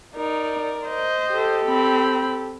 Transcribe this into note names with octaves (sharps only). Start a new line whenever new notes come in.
D#4 A#4 D5
C5 D#5
G4 A4
C4 B5